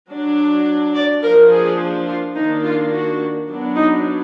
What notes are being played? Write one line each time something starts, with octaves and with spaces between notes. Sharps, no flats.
F#3 D4
D5
F3 A#3 D4 A#4
G#4
F4
D#3 A#3 D4 D#4
F4
F#4
F#3 B3 D4
D#4